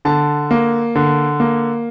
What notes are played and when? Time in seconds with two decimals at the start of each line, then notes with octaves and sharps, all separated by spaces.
0.05 D3 A5
0.51 A#3
0.95 D3
1.40 A#3